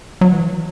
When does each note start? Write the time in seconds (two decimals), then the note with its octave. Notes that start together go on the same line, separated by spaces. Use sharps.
0.21 F#3
0.33 E3